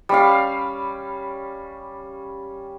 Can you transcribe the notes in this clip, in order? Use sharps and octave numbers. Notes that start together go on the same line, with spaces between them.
G3 C#4 F5